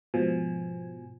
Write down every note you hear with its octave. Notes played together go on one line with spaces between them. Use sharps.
G#2 B2 F3 G#5